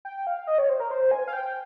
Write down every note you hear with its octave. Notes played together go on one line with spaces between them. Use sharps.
G5
F5
D#5
C#5
C5
A#4
C5
G#5
F5
G5